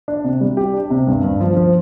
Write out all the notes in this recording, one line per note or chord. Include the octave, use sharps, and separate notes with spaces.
D4
C3
G3
G4
D4
C3
G2
G2
F3
F3